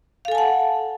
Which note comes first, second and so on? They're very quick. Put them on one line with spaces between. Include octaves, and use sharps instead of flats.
F5 A4 G#5 A5 F#5